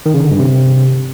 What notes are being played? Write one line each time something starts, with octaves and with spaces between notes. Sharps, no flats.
D#3
C#3
D3
G2
C3